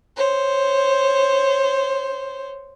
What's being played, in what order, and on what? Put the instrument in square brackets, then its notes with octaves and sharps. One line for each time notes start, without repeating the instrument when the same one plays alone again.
[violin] C5 C#5